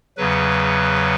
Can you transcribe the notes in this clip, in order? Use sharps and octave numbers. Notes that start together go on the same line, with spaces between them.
E2 C#3 F#3 B4